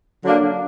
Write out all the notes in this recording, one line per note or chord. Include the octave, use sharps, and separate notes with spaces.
D3 F#3 A#3 D4